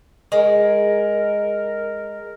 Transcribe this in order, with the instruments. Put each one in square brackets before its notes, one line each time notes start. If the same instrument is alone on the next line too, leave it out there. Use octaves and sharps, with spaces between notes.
[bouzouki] G#3 [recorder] A#4